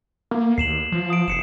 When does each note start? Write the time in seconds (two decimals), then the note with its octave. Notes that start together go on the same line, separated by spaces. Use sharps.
0.31 A#3
0.58 D#2 C7 E7 F#7
0.92 F3
1.10 D#6 D7
1.28 F1 C7 C#7 E7